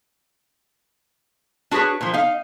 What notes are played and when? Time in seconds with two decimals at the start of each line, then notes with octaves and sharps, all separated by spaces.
1.71 D4 F#4 G#4 B4 C#5
2.01 A#2 F3
2.14 D#4 F5